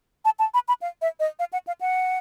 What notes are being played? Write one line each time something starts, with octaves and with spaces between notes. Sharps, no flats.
A5
A5
B5
B5
F5
E5
D#5
F5
F#5
F5
F#5